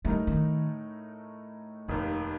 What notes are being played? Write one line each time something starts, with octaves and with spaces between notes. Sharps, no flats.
A2 G3 A3 D#4 A#4
D#3
F1 D#2 C3 D#3